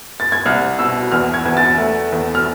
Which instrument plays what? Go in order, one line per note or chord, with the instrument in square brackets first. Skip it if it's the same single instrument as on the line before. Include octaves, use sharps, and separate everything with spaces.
[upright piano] A6
G#6
C2 F6
B2 E6
E2 F6
G#6
E2
A6
A3
E2
F6